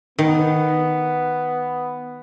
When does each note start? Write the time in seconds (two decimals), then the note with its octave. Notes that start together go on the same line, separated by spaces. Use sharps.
0.19 D#3 B3